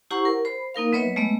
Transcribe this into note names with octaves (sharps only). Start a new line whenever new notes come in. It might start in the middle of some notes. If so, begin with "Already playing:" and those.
E4 G4 C5 F#5 A#5 C#6
A#4
C5 B5
A#3 D#4 A#4 F5
F#3 B3 B4 C#5 D#5 E5
G#3 A3 B3 D#5